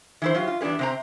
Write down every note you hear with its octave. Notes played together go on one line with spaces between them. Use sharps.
E3 E4 C5
F#3 F4 G4
F4
E2 G3 D4 G#4 B4
C3 C4 A#5